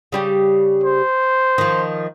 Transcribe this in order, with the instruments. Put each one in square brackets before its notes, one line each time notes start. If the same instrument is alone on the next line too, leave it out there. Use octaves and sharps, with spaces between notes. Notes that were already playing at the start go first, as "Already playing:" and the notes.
[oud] C#3 G3 G4
[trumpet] C5
[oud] D#3 F3